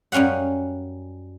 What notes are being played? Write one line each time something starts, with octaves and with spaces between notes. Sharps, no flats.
F#2 G3 C#4 F5 F#5